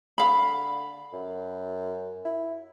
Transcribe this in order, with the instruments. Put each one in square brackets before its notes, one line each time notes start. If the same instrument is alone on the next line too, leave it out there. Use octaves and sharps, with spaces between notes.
[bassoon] D3 [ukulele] F5 B5
[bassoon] F#2
E4